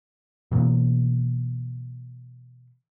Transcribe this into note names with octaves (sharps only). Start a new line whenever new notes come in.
B2 E3 A#3